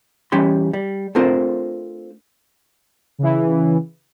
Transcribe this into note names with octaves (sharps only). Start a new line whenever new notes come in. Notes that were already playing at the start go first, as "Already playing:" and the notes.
E3 G3 C#4 G4 B5 C6
G3
A3 C4 D4 F4 A#4 C5
C#3 E3